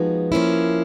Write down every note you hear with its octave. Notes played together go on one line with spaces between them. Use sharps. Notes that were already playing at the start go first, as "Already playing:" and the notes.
Already playing: F3 G#3 B3 D#4 F#4
F3 A#3 C#4 E4